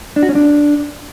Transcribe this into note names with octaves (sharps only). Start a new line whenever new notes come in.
D4
F#4
C#4
D4